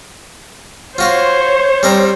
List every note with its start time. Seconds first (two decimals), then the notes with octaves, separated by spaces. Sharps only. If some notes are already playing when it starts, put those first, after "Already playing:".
0.98 F4 F#4 C5 C#5 F5
1.83 G3 C4 A#4